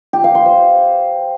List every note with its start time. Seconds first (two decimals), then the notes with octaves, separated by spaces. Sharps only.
0.13 G4
0.24 F5
0.35 C6
0.46 C5